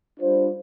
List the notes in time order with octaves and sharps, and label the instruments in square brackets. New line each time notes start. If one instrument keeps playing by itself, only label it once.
[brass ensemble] G3 D4 F4 C5